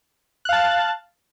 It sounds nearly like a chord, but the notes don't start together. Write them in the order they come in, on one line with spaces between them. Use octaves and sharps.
F#6 F5 A5 A6